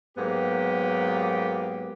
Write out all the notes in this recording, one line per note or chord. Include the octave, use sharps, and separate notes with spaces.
G#2 F#3 A#3 B3 G4